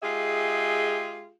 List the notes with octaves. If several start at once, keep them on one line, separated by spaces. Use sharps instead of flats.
G#3 F4 G4 G#4 E5